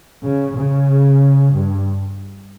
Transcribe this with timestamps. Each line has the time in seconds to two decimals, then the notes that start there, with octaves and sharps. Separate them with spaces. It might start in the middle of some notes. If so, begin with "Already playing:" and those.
0.24 C#3
0.56 C#3
1.53 G2